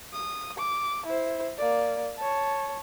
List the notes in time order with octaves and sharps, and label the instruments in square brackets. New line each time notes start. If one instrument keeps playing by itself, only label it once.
[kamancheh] D#6
D6
E4 C5
A#3 D5
C#5 A5